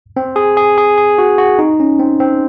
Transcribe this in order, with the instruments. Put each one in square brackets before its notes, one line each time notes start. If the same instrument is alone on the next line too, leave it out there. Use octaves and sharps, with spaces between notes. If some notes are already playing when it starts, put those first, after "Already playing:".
[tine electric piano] C4
G#4
G#4
G#4
G#4
F#4
F#4
D#4
C#4
C4
C4